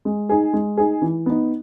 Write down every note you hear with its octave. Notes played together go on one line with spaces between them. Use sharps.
G#3
D#4 G#4
G#3
D#4 G#4
E3
B3 D#4